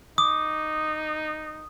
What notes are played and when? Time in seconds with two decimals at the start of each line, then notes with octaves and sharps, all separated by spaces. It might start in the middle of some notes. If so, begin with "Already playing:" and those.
0.18 D#4 D6 D#6